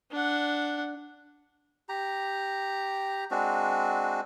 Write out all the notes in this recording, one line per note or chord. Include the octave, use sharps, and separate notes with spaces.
D4 F#5
G4 A#5
G#3 C4 D4 F#4